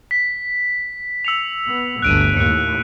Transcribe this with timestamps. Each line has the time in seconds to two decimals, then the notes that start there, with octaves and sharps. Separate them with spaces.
0.11 B6
1.25 E6 C#7 F7
1.68 B3
2.02 G1 D2 F#6 D7 D#7
2.37 D#2 A2 F#6 C#7